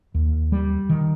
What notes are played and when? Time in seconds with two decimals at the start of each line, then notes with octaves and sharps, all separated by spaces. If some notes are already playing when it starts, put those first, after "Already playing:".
0.14 D#2
0.52 G3
0.89 D#3